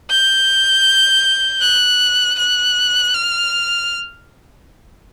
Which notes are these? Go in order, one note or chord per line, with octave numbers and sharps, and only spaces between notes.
G6
F#6
F#6
F6